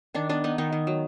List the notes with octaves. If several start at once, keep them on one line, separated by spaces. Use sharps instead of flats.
D#3 D4
B3 D4
B3 D#4
D#3 D#4
D#3
F#3